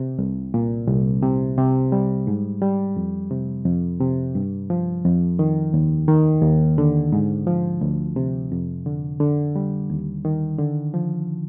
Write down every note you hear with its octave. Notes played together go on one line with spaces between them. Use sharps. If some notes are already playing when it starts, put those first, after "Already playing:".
Already playing: C3
C2
A#2
C2
C3
C3
G3
G#2
G3
F2
C3
F2
C3
G2
F3
F2
D#3
D#2
D#3
D#2
D3
G#2
F3
D2
C3
F2
D3
D3
G3
D#2
D#3
D3
F3